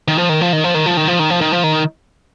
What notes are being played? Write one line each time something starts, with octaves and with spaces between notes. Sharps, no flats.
D#3
F3
D#3
F3
D#3
F3
D#3
F3
D#3
F3
D#3
F3
D#3
F3
D#3